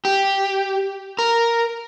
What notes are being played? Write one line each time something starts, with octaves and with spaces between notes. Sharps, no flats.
G4
A#4